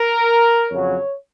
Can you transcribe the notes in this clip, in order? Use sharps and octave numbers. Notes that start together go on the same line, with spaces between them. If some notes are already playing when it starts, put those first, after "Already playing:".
Already playing: A#4
F2 C#3 F#3 C#5